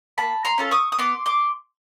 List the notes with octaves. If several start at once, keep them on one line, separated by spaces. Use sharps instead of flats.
A#3 A5 B5
A#5 C6
C#4 F4 A4
C#6 D#6
D#6
B3 C6 D6
C6 D6